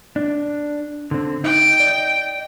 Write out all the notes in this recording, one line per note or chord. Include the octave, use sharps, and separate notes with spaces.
D4
D3 C4
D#4 G5
D5 D#5